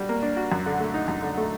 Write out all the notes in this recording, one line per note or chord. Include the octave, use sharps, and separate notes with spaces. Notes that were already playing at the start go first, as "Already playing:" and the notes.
Already playing: G3 D4 F#4
A#3
D4
F#4
F#2
D3
A3
D#4
F#2
D3
A3